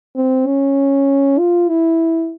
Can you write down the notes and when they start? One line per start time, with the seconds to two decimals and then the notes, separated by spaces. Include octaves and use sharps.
0.16 C4
0.47 C#4
1.39 F4
1.69 E4